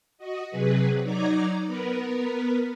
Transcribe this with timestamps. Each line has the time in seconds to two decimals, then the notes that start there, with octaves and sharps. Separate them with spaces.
0.18 F#4 D#5
0.50 C3 F#3 G#4 B4
1.04 F#3 D#4 D5 A#5 D6 G#6
1.66 B3 A#4 B4